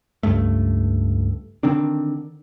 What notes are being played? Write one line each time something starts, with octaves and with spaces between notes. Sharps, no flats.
C#2 G2 A3
D3 D#3 C4 D4